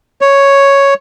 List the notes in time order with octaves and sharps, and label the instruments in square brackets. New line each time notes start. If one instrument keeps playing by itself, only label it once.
[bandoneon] C#5